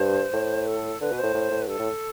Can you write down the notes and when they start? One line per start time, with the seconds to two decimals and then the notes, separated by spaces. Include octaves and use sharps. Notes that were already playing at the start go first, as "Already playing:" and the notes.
Already playing: G2 C5
0.33 A2
0.67 A4
1.01 D3 B4
1.12 B2
1.18 A2 C5
1.34 A2
1.51 A2
1.62 B4
1.68 G2 A4
1.79 A2